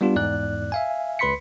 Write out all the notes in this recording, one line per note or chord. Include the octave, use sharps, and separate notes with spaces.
G3 B3 D4 F4 G4
E2 G#2 D5 F#6
E5 F5 G#5
C#2 B4 B5 C6 B6 C#7